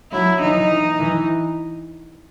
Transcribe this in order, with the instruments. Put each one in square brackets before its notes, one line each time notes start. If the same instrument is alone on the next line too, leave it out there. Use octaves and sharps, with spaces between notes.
[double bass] F#3 [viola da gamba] E4
[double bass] E3 [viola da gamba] D#4
[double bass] E3